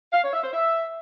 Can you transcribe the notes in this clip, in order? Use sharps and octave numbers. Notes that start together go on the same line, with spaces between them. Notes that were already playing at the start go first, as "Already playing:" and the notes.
F5
C#5
E5
C5
E5